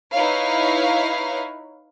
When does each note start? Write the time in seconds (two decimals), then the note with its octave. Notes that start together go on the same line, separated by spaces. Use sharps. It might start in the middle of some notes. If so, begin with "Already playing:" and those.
0.12 D#4 E4 B4 C#5 F5